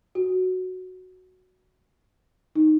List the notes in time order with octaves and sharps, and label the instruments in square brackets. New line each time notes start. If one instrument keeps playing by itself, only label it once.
[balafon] F#4
D#4